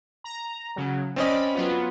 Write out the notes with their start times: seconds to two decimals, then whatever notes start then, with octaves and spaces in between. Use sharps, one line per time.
0.24 A#5
0.76 C#3 F#3
1.16 C4 C#4 D5 D#5 B5
1.55 F#3 B3 F4